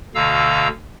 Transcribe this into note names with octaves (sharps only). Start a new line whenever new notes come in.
D2 B2 D3 F5 A#5 E6